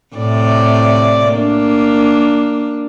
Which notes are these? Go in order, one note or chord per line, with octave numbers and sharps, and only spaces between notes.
A2 C3 D5
A#3 D4